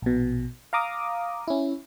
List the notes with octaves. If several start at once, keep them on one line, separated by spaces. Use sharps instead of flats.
A#1 B2
F5 A#5 D6 D#6
C#4 E4